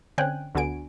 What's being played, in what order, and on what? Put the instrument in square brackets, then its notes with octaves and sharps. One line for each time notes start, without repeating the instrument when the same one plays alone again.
[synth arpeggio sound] D3 C4 C#4 G5 G#5 F#6
D2 D3 B3 F#4 G#5 D7